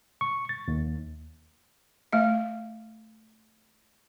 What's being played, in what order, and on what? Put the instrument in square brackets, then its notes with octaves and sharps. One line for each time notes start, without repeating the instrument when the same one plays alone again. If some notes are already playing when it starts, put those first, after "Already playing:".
[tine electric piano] C#6
A6
D#2
[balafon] A3 F5